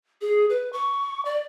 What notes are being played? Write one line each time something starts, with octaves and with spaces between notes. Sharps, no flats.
G#4
B4
C#6
D5